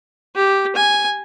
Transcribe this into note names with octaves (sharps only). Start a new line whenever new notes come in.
G4
G#5